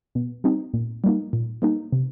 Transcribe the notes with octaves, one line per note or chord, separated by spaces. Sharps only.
B2
G3 C4 D#4
A#2
G3 A#3 D#4
A#2
G3 A#3 D#4
C3